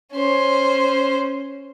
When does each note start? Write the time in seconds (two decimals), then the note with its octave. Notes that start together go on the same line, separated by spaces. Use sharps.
0.13 C#4 C5